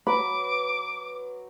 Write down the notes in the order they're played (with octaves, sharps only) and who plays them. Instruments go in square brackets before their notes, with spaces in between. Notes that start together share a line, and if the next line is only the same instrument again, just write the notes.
[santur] F#3 [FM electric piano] B4 [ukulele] B5 [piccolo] D6